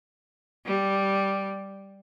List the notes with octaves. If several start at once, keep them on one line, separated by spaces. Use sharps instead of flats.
G3